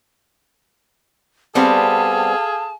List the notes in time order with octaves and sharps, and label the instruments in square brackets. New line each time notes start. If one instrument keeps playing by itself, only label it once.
[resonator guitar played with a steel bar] G3 B3 C4 [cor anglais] G#4 [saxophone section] A4 F5 [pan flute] A5